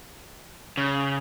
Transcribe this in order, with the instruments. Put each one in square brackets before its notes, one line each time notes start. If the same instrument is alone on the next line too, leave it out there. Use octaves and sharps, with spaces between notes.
[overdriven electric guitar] C#3